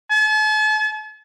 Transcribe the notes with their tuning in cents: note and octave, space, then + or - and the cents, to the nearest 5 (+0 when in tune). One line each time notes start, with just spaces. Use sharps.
A5 -45